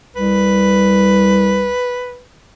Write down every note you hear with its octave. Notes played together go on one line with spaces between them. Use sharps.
C2 B4